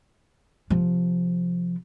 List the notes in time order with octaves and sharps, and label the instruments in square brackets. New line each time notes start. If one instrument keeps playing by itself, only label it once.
[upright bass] C3 F3